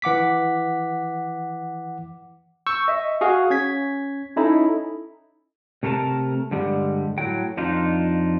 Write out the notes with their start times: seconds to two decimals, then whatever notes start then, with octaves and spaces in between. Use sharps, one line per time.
0.02 E3 F#5 D6 B6
2.67 C#6 E6 G6
2.88 D#5 E5
3.21 F#4 G#4 F5
3.50 C#4 G#6 B6
4.36 C#4 D#4 E4 A4
5.83 C3 A3 A#4 C5 A5
6.51 G2 D3 G3 G#3
7.18 A2 F#3 G5
7.57 F2 D4 D#4 F4